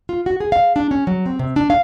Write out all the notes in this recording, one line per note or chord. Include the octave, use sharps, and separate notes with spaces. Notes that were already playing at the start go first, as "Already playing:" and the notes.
F4
F#4
G#4
F5
D4
C#4
F#3
C4
C3
D4
F5